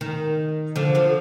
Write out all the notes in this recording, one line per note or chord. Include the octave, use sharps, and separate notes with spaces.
D#3
D3 F3
D3 F3